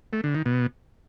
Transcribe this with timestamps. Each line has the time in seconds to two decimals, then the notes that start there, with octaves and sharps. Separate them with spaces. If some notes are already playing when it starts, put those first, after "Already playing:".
0.13 A3
0.24 D3
0.35 D#3
0.46 B2